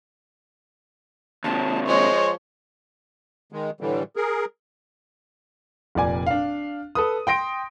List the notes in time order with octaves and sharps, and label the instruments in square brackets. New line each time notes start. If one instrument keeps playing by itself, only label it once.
[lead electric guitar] D#2 C3 [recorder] A5
[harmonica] F3 G#3 C5 [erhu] C#5 [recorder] D#5
[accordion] D#3 G#3
A2 D3 E3 G3
G#4 A#4
[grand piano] F1 A#2 D5 G#5
D4 F5
A4 B4 D#6
G5 C6 A#6 D7